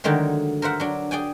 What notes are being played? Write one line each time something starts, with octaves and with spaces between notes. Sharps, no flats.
D3 D#3 F#3 G#3 A3
A#4 C5 E5 F#5
F#3 D4
G#4 D5 G5 G#5